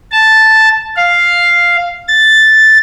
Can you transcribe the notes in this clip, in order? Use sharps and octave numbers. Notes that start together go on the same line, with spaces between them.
A5
F5
A6